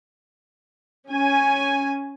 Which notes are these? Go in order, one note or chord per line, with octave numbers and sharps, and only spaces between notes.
C#4 G#5